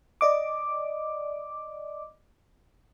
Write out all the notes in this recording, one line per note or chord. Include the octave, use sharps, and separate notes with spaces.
D5 D#5 D6